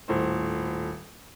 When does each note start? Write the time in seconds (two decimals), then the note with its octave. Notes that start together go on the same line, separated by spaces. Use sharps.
0.08 D#1 A2 C5